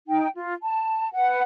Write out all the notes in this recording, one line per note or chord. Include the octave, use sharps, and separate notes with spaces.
D#4 G5
F4
A5
B4 F#5